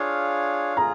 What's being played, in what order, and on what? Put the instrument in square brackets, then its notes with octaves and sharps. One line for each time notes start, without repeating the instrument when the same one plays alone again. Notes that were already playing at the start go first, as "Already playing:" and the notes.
Already playing: [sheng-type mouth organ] D4 F4 G#4 C#5 F5
[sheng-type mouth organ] F4 G#4 [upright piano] A#5